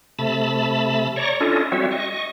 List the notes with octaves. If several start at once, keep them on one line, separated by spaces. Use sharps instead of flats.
C3 A3 A5 B5
C#5 D5 A#5 C#6
C#4 D4 E4 F4 A4 D#5
G3 C4 F#4 C#5 E5
D#5 C#6